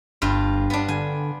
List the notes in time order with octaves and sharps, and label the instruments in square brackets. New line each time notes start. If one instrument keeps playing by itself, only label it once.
[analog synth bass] G1 [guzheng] G2 F4
[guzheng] B3 D4
[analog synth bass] D3 [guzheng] G#5